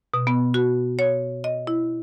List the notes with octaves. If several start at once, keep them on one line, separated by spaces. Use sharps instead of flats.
B2
B3
F#4
C#5
D#5
E4